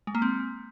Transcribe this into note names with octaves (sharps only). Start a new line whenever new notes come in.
G#3
A#3
C4